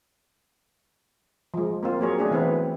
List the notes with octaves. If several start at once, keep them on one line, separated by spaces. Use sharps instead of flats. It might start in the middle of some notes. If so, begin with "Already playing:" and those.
F3 G#3
A#3 C4 F4
F#3 A#3 G#4 C#5
A3 D4 G#4
E3 B3 C4 D4 E4 B4